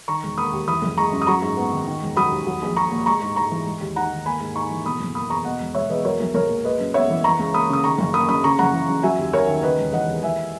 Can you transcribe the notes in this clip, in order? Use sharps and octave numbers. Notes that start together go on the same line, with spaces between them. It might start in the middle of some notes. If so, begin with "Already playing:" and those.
D#3 A#5 C#6
E1
A#3 B5 D#6
D#2
E3 B5 D#6
F#1
G#3 A#5 C#6
F#2
D#6
F#3 A#5 C#6
G#2
B3
D#3
D#3
E1
F#3 B5 D#6
D#2
F#3
A#1
A#1 A#5 C#6
A#2
G#3 A#5 C#6
G#2
G#2 A#5 C#6
E3
G#3
D#2
D#4 F#5 A#5
D#3
A#3 G#5 B5
G#2
D#4 A#5 C#6
E3
B2 B5 D#6
F#1
A#3 B5 D#6
E2 A#5 C#6
B2 D#5 F#5
E1
E1 C#5 E5
E2 B4 D#5
F#3 A#4 C#5
B1
B1 A#4 C#5
A#2
G#3 B4 D#5
F#2
B3 C#5 E5
E3
E3 A#5 C#6
C#2
A#3 B5 D#6
C#3 D#6
D#3 A#5 C#6
F#1
A#3 B5 D#6
F#2 B5 D#6
C#3 A#5 C#6
F#1 F#5 A#5
E3
F#2
F#3 E5 G#5
D#2
D#2 A#4 C#5
D#3
C#3 B4 D#5
E1
E3 D#5 F#5
E2
E3 E5 G#5